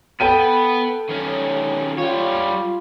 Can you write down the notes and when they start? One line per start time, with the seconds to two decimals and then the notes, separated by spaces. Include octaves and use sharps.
0.20 B3 A4 B4 G5 D#7
1.10 D#3 C#4
1.98 G3 F4 C#5